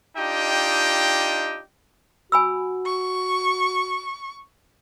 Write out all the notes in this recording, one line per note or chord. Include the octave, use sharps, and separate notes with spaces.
D4 D#4 F4 G4 D#5 G5
F#4 G#5 B5 E6
C#6